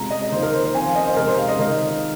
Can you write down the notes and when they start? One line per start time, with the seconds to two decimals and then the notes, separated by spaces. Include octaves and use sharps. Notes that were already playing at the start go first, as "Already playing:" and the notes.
Already playing: C3 G#3 F4 A#5
0.10 D#5
0.32 D#3 A#3 F4 C5
0.43 A#4
0.54 C5
0.64 C5
0.74 F3 C4 F4 G#5
0.86 F5
0.95 D#5
1.06 C5
1.16 C3 G#3 D#4 A#4
1.27 C5
1.38 F5
1.48 D#5
1.59 D#3 G#3 F4 A#4